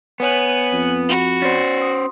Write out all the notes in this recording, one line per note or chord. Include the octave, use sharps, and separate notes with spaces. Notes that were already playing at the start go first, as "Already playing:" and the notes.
B3 B4 C#5 G#5 F#6
F2
F#4 F#5 B5
C#4 C5 D5 A6
C6 D#6